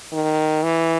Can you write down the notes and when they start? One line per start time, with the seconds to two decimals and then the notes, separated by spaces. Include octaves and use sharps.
0.13 D#3
0.63 E3